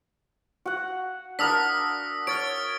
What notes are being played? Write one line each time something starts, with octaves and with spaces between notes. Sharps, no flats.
F#4 F#5
D4 A#4 F#5 D#6 E6 B6
C#5 F6 A6 D7